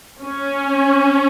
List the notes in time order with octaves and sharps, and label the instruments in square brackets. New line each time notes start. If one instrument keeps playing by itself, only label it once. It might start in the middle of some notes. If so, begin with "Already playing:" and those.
[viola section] C#4